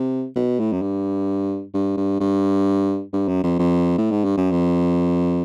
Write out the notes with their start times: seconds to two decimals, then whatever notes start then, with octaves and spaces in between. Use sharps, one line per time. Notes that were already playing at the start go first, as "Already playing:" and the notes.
Already playing: C3
0.36 B2
0.60 A2
0.73 F#2
0.82 G2
1.74 G2
1.97 G2
2.20 G2
3.13 G2
3.28 F#2
3.43 F2
3.59 F2
3.98 A2
4.11 G#2
4.25 G2
4.37 F#2
4.51 F2